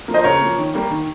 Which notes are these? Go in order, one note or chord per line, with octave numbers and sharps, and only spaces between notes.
F3 A#3
C5 D#5
C#3 A#4 C#5
F3 A#3
D#3
G3 A#3
D#3